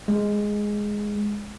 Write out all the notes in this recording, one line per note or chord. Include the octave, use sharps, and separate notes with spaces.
G#3